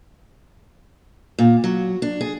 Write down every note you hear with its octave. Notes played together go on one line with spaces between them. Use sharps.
A#2
F#3
D4
G#4